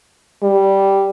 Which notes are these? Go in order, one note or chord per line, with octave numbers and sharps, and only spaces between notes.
G3